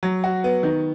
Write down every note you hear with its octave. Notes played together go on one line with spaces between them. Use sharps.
F#3
F#4
B3
D#3